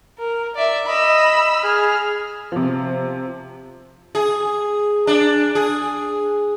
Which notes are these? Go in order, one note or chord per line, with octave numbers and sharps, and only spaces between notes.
A#4
D5 E5
D#5 B5 E6
G#4 F6
C3 F3
G#4
D4
G#4